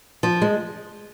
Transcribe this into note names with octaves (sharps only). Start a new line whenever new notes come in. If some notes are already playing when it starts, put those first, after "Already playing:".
F3
G#3